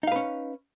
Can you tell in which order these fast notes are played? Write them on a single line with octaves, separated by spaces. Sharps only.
D#4 F5 B4 C#4